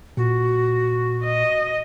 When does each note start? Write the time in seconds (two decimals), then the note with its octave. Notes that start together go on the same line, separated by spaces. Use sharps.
0.17 A#2 F#4
1.24 D#5